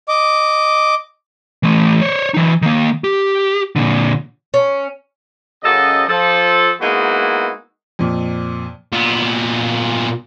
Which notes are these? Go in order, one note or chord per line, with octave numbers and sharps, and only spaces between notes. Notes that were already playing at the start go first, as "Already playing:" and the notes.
D#5 D6
E3 A3
C5 C#5
E3 D#4
D#3 A#3
G4
A#2 D3
C#4
F#2 C#3 F#4 A4 D#5
F3 A4
G#3 A#3 B3 D#4 E4 F#4
F2 A#2
A#2 B3